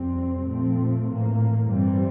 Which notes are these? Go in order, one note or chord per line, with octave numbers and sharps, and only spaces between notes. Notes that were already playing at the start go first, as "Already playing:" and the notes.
Already playing: F2 C3 G3 C4
A#2 F3 A3 C4
A2 E3 A#3
G2 E3 G3 C4